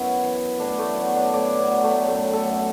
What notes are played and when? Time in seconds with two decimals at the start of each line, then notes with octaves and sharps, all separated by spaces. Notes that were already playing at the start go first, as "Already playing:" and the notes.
Already playing: F#2 B3 E4 F#4
0.23 E3
0.60 A2 D4
0.79 A3
0.97 F#3 B3
1.16 D4
1.34 A2 D5
1.59 B3
1.71 F#3
1.84 A3
2.08 F#2 A3
2.33 A4
2.45 F#2